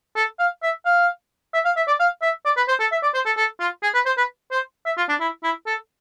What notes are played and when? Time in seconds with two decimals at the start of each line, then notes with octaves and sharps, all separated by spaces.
0.16 A4
0.39 F5
0.63 E5
0.85 F5
1.54 E5
1.65 F5
1.77 E5
1.88 D5
2.00 F5
2.22 E5
2.45 D5
2.57 B4
2.68 C5
2.80 A4
2.92 E5
3.03 D5
3.14 C5
3.26 A4
3.37 A4
3.60 F4
3.83 G#4
3.94 B4
4.06 C5
4.17 B4
4.52 C5
4.86 E5
4.97 F4
5.09 D4
5.20 E4
5.43 E4
5.67 A4